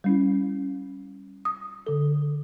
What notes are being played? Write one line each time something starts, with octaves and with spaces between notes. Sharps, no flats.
G3 C#4 E4
D#6
D3 A4